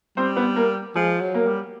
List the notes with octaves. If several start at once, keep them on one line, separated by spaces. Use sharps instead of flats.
G3 C4 C5
B3 B4
A#3 A#4
F3 G#3 G#4
F#3
A#3 A#4
G3